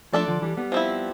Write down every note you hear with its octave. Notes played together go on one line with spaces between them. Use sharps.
F3 A3 D4 A4 D5
D3 F3
E3 G3
G3 B3
F3 C4 E4